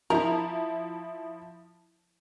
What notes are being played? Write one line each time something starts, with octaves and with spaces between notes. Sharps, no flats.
F3 E4 A#4